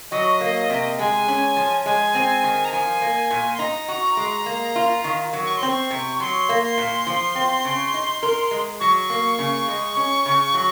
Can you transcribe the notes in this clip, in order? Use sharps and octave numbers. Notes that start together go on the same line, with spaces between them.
F#3 D#5
A#3
C3
G#3 G#5
C#4
F3
G#3 G#5
C4
D#3
A#5
F3 G#5
A#3
A#2
C6
D#4 A#5
F#4
G#3
A#3
F4
D#3
F#3
C#6
C6
C4
C#6
C3
F#3 C6
A#3
C6
A#2
F3
C4
C#3
D#4
A#4
G#3
F#3 C#6
A#3
C#3
G#3
C#4
C#3
F#3